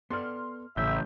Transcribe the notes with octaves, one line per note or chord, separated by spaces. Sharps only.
B3 A4 D5 C6 F6
A1 C#3 E3 E5 G6